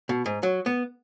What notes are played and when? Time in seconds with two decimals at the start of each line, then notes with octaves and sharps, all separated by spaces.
0.09 B2
0.26 G#2
0.43 F#3
0.66 B3